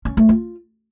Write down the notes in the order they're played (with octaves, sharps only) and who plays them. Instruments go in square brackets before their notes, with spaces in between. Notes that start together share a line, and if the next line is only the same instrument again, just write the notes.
[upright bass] C#4
A3
F4